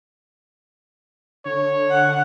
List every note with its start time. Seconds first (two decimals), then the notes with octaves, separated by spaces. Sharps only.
1.45 D3 C#5
1.91 F#5